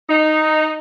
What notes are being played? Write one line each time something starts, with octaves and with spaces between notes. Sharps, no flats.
D#4